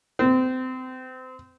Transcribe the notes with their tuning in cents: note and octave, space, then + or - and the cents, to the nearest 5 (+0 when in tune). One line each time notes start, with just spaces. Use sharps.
C4 -30